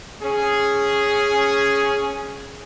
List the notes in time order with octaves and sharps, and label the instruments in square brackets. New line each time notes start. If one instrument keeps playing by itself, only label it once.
[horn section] C#4 G#4